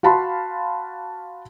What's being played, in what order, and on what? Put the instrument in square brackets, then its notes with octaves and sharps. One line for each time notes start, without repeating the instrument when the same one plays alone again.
[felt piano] F#4 F5 A5 B5 C6